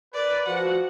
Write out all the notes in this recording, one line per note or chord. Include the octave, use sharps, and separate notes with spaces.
A#4 B4 D5
F3 F#4 F#5